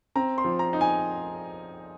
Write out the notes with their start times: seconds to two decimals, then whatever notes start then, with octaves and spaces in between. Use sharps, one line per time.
0.15 C4 A#5
0.38 C6
0.44 F3
0.59 A#5
0.73 D#4
0.81 G#5